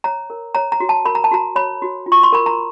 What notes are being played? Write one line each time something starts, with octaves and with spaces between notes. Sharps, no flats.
C#5 A#5
A#4
C#5 A#5
A#5
F#4
A5
A#4 B5
A#5
A5
F#4 A#5
C#5 B5
F#4
F4
C#6
C6
A#4 B5
A#5